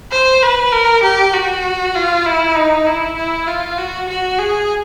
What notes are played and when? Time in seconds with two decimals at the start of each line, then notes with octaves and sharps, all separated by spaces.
0.12 C5
0.43 B4
0.73 A#4
1.03 G4
1.33 F#4
1.95 F4
2.26 E4
2.56 D#4
2.87 E4
3.17 E4
3.48 F4
3.78 F#4
4.09 F#4
4.39 G#4